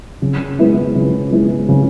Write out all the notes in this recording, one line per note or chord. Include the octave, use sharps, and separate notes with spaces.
C#3
G#3 B3 E4
C#3
G#3 B3 E4
C#3